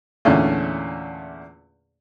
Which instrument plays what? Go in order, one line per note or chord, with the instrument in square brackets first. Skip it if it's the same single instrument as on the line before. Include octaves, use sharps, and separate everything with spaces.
[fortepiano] E2 A#2 D3 A3 C#4